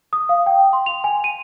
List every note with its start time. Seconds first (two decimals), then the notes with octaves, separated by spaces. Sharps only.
0.13 D#6
0.29 F5
0.46 G5
0.73 C6
0.86 F7
1.04 G#5
1.24 D#7